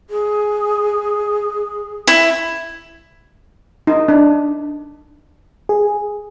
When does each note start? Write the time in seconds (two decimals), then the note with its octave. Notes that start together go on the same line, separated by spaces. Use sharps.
0.10 G#4
2.07 E4
3.87 D#4
4.08 D4
5.69 G#4